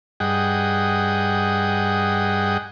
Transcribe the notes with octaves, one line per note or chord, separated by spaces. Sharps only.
G2 G#4 D#5 F#5 G5